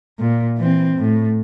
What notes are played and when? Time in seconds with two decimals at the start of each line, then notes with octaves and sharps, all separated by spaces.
0.19 A#2
0.58 E3 C4
0.99 A2